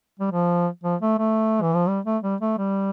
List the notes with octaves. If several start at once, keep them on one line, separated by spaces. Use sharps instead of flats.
G3
F3
F3
A3
A3
E3
F3
G3
A3
G3
A3
G3